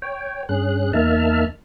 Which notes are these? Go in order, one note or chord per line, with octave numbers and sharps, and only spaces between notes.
C#5 G5
G2 C#4 G#4 F#6
E2 A#3 D#4 E5 A5 F6